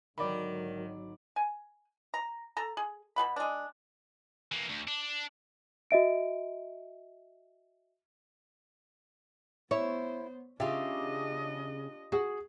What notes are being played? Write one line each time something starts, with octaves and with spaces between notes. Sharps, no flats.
G#1 D3 D#3 F#3 A#4 D5 B5
G#5
A#5
A4 A5 A#5
G#4
B2 G#4 F#5 B5
G#3 D4
E3 A#3
D2
D4
F#4 D#5 E5 D7
B3 E4 C5 C#5
C#3 D4 F4 G4 D#5 E5
F#4 G#4